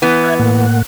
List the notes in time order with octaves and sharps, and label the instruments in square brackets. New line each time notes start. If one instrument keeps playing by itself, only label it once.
[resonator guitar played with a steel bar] E3 B3
[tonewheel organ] E5 F#6 G#6
A2 A#3 F#5